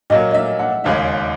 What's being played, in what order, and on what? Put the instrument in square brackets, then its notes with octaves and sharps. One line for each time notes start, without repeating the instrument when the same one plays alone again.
[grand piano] A#2 F#3 A#3 [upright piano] D#5
[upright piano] D#5
E5
F#5
[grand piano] E1 D#2 C#3 G#3 [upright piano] E5